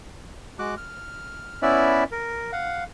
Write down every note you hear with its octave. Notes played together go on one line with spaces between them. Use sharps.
G#3 F#4 D6 F#6
F6
B3 C#4 E4 B4 D5 E5
A#4
F5 F#5